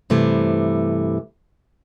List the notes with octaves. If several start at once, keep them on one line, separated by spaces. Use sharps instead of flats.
G2 C3 E3 A3